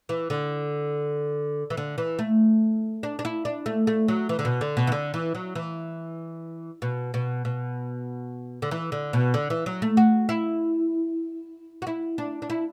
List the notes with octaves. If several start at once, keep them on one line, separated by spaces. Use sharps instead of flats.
E3
D3
E3
D3
E3
A3
D4
D4
E4
D4
A3
A3
F#3
E3
D3
B2
D3
B2
E3
D3
E3
F#3
E3
B2
B2
B2
D3
E3
D3
B2
D3
E3
F#3
A3
F#4
E4
F#4
E4
D4
D4
E4